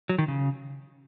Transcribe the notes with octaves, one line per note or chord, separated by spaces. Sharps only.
F#3
D#3
C#3